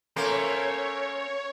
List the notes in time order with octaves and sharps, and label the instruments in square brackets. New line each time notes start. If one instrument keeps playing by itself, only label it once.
[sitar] A3 A#3 [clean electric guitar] C#4 A#4 C5 [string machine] C#5